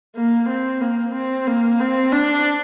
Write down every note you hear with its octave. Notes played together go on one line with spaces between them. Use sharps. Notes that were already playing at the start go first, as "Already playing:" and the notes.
A#3
C4
A#3
C4
A#3
C4
D4